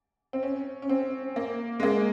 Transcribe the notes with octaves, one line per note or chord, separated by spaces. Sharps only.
C4
C#4
C#4
C4
A#3
G#3
A#3